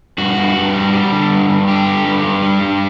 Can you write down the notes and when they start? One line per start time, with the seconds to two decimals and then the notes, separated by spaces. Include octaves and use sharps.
0.18 G2 F#4
0.37 G2
0.56 G2
0.74 G3
0.93 G3
1.12 D3
1.31 G2
1.49 G2
1.68 D3 G4
1.86 D3
2.05 G2
2.24 G2
2.42 G3
2.61 G2